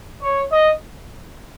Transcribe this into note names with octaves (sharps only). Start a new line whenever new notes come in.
C#5
D#5